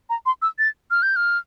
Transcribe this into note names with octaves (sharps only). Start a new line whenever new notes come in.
A#5
C6
E6
A6
F6
G6
F6